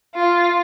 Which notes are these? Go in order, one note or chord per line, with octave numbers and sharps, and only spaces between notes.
F4